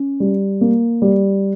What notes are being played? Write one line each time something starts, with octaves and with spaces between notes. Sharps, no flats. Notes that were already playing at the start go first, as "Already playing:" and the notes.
Already playing: C#4
G3
A#3
G3